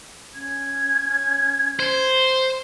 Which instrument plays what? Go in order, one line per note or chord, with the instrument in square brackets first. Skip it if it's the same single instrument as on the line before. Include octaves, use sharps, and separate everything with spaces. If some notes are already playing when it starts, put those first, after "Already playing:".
[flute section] C#4 G#6
[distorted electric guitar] C5